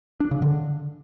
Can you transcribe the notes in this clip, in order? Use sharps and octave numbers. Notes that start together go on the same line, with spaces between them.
D4
C#3
D3